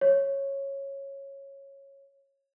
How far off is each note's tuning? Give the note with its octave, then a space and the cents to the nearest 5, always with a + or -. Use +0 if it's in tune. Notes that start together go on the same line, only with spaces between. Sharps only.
C#5 -10